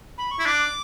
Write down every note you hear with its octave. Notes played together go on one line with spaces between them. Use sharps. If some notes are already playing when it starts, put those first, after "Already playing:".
B5
C#6
E4
D4 D6